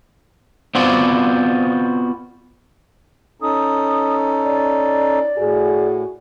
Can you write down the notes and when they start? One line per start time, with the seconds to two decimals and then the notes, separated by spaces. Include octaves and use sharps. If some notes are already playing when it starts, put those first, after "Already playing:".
0.75 B3 C4 F4 F#4 C5 D5
3.42 C#4 D#4 A4 D#6
4.44 D5
5.38 A2 F#4 G#4